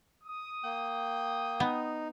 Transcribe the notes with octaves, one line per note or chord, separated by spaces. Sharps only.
D#6
A#3 G5
B3 D#4